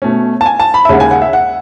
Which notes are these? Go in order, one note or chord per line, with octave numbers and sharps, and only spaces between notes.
B2 A3 C#4
A5
G#5
A5
B5
E5
D#2 C#3 G#3 C#4 F#5
G#5
F#5
E5
F#5